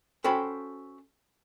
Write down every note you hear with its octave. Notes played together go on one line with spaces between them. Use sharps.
C#4 F#4 A4 C5 G5 B5